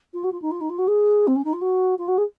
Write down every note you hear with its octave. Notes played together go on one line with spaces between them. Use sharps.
F4
F#4
F4
D#4
F4
D#4
F4
F#4
G#4
C4
C#4
D#4
F4
F#4
F4
F#4
G#4